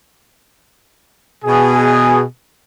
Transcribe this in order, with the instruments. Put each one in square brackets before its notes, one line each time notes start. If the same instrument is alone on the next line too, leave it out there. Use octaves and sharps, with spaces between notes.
[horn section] B2 G#4